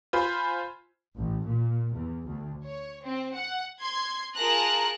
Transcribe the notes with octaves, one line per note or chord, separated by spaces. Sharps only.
F4 C5 G#5 B5
A1
A#2
E2
D2
C#5
C4
F#5
C6 G#6
F4 G#4 A#4 A5 A#5 F#6